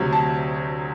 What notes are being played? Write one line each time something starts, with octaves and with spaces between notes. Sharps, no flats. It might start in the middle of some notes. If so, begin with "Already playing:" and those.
Already playing: D2 C3 F#3
A5